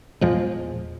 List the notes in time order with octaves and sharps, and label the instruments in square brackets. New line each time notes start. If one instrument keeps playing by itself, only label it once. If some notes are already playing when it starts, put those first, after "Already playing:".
[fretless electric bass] E2 A#2 F3 G#3